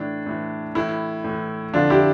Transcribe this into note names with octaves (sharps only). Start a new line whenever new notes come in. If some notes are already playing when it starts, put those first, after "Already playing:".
Already playing: A2 E3 D4
A2 E3
A2 E3 E4
A2 E3
F2 D3 F3 D4 F4
E4 G4